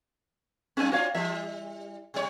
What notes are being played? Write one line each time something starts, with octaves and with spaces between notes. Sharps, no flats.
F#2 G3 C4 C#4 G#5
C4 D4 F4 F#4 C#5 F5
E3 G3 E5
B2 G3 C#5